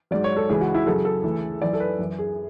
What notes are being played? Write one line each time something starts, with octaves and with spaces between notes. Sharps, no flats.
G#2 F#3 D5
C#5
A4
C#2 C#3 E3 G#4
F#4
E4
F#2 C#3 F#3 A4
A4
D2 C#3 E3
F#2 E3 D5
A4
B4
F#2 E3
G#4